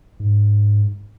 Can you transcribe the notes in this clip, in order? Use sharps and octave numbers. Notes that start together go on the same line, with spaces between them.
G#2